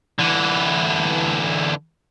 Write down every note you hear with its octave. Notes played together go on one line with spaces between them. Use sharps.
D3 E3